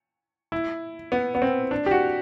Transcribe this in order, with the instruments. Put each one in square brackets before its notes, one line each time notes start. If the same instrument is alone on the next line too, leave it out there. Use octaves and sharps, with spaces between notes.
[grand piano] E4
B3
B3
C4
D4
G4
F#4